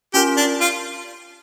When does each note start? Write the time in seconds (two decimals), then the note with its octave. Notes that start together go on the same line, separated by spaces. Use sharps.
0.14 C#4 F4 G4 A#4
0.37 D4
0.61 F4